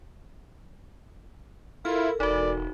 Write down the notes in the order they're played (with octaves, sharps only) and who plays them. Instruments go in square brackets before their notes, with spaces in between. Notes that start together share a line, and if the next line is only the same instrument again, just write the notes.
[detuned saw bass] E4 [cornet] F4 [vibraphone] A4 A#4 [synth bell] F6
[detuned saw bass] E1 [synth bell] D#4 F#4 [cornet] D5